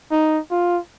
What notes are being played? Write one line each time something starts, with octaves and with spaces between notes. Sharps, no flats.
D#4
F4